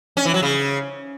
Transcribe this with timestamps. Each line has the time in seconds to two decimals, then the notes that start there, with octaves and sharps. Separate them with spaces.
0.17 C#4
0.25 E3
0.34 F#3
0.43 C#3